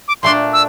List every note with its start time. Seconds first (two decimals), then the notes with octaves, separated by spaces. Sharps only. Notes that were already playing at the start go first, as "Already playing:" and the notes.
0.08 D6
0.23 A#2 A3 D4 C6
0.53 E6